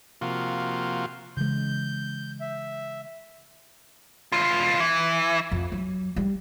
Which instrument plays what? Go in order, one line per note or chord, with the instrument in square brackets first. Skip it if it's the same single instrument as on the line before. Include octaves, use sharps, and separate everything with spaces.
[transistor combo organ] C3 F3 A#3 F4 F#4
[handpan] C#3 E3 G#3 [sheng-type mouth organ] G6
[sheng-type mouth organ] E5
[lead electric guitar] E2 F4
E3
[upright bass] F2
F#3
G3